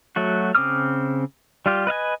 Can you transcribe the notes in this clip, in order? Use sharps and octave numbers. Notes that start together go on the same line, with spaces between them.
F#3 A3 F#4
C#3 C4 D6 D#6 F6
G3 F4 G4
B4 D#5 F5 G#5